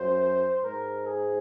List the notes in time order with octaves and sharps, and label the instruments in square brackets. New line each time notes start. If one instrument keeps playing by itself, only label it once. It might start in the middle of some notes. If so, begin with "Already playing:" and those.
Already playing: [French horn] F#2 [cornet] C5
[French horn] G#2 [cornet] A#4
[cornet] G#4